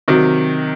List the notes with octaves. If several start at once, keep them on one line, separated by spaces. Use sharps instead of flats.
C3 D#3 F#3